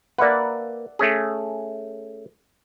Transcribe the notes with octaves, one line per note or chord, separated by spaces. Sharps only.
A#3 B4 D5 E5 F#5
A3 C#4 G#4